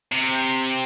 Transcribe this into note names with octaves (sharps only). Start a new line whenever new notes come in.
C3